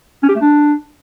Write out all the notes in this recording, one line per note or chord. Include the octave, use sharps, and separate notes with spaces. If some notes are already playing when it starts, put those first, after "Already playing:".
C#4
G4
A3
D4